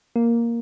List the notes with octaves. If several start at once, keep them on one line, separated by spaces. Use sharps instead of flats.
A#3